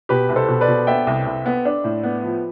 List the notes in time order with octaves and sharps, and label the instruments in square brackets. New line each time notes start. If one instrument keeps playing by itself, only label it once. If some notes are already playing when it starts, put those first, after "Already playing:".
[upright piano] B2 [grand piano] G4 B4
[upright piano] C2
[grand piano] A4 C5
[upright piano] B2
[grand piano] B4 D5
[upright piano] B2
[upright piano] B3 [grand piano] E5 G5
[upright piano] C2
C2
B3
D4
A2
B3
F3